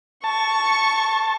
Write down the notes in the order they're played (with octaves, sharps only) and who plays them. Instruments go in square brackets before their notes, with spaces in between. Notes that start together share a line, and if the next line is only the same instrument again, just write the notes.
[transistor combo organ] A5 [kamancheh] C#6